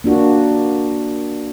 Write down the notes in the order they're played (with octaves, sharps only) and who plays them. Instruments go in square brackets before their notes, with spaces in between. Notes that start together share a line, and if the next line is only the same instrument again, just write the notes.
[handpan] A#3 D4 F#4